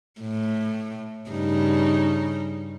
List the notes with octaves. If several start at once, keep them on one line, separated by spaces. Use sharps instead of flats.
A2
G2 C#3 D#4